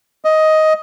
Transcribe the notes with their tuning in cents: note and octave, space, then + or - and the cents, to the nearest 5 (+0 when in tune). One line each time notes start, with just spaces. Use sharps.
D#5 +10